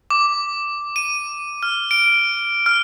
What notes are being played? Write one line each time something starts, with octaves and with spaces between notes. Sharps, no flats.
D6
D#7
F6
D7
F6